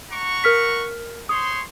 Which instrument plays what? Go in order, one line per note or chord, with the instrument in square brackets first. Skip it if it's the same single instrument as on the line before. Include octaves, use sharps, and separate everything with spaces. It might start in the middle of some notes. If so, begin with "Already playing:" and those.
[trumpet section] F#5 A#5 C#6
[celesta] A#4 F6 B6
[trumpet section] C5 C#5 C6 [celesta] D#6